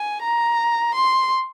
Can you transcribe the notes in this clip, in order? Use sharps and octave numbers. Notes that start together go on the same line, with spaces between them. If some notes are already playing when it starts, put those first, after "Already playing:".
Already playing: G#5
A#5
C6